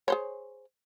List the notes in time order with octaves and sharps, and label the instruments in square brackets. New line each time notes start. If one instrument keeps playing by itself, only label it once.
[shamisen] G#4 C5 C#5